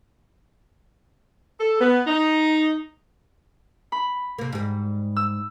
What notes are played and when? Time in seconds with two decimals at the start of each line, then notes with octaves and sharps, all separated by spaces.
1.60 A4
1.80 B3
2.07 D#4
3.92 B5
4.38 C3 A#3
4.53 G#2 G3
5.16 E6